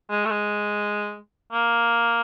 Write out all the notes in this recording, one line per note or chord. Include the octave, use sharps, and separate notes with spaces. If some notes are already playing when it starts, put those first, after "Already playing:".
G#3
A3
G#3
A#3